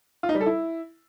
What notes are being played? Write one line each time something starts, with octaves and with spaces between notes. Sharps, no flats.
F4
D#4
G3
A4
E4